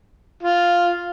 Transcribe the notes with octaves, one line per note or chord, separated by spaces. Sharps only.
F4